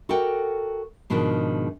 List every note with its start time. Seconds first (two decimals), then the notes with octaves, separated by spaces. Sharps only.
0.09 F#4 A4 A#4 D5 F#5 G5
1.10 G#2 B2 D#3 F3 G#3 D4